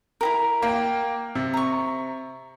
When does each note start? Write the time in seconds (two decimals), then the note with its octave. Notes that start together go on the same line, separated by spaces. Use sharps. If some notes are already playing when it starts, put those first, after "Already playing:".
0.21 E4 G4 A#4
0.62 A#3 G5
1.35 C3
1.54 A#5 C#6